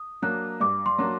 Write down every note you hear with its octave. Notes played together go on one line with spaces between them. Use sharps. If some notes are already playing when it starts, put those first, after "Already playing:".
Already playing: D#6
F#3 A#3 D4 F#6
G2 D6
C6
F#3 A#3 D4